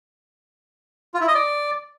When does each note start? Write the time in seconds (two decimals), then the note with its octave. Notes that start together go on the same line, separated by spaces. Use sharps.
1.14 F4
1.21 E4
1.28 D#5
1.35 D5